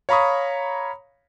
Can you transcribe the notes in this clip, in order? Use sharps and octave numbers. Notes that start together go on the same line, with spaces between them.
C#5 F5 A#5 B5 C#6 D#6